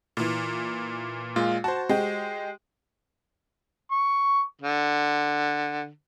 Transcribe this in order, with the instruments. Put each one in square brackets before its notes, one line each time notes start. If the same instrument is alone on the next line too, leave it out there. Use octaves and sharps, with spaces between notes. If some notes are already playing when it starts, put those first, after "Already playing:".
[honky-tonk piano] A#2 E3
[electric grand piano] A#2 G#3 F4
[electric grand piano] F#4 C5 [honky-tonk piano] A5
[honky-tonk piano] G#3 G4
[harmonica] C#6
D3